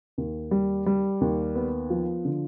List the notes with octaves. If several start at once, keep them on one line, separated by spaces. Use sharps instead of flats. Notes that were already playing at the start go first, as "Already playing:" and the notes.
D#2
G3
G3
D#2
B3
F3
D3